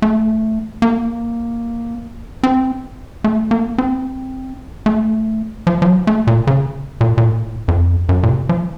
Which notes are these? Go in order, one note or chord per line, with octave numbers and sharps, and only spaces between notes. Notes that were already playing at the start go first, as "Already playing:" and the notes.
A3
A#3
C4
A3
A#3
C4
A3
F3
F3
F#3
A3
A#2
C#3
A#2
A#2
A2
F2
F#2
A#2
C3
F3